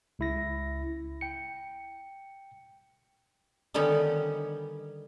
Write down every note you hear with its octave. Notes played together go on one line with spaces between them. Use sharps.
C#2 E4 A#6
G5 C#7
D3 D#3 G3 B3 C#4 D#4